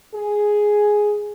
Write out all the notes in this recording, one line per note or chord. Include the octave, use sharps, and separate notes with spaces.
G#4